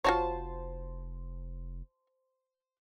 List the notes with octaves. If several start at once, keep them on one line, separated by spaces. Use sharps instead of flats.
F1 F4 F#4 C5 C#5 A5